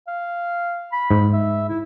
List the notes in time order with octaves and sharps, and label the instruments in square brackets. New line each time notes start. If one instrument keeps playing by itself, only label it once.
[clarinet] F5
B5
[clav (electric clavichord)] G#2
[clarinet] E5
E4